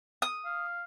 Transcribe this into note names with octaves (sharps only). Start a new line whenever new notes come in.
D#6
F5